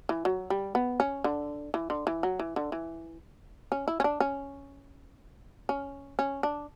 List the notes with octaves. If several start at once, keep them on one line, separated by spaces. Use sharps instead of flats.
E3
F#3
G3
B3
C#4
D3
E3
D3
E3
F#3
E3
D3
E3
C#4
E4
C#4
D4
C#4
C#4
C#4
D4